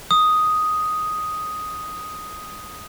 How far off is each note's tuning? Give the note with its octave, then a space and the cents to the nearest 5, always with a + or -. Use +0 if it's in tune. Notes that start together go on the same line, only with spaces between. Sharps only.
D#6 +0